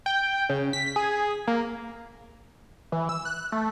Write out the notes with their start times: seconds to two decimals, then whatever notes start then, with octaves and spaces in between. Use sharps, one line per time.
0.06 G5
0.49 C#3
0.73 B6
0.96 G#4
1.47 A#3
2.92 E3
3.09 E6
3.25 F#6
3.52 A3